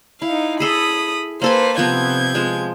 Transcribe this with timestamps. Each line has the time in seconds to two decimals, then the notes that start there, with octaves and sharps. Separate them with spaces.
0.22 D#4 E4 F5
0.60 G#4 A4 E5 B5 D#6
1.42 A#3 A4 B4 C5 G#5
1.78 C3 F3 B3 C4 G6 G#6
2.35 F3 G#3